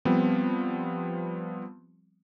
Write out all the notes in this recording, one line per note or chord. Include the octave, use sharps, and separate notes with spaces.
F3 G3 B3 C4